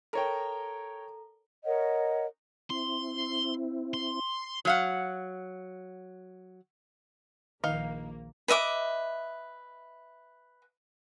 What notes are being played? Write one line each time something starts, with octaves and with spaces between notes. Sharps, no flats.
A4 A#4 C#5 G5 A#5
A#4 C#5 D#5 F#5
C4 E4 C6
C6
F#3 F5 F#5
A#1 D#3 A#3 D#4 F5
B4 D#5 E5 D6